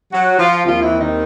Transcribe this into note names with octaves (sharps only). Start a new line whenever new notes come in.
F#3 F#4
F3 F4
D#2 D#3 F3 G3 C4 F4
E3 E4
D#3 D#4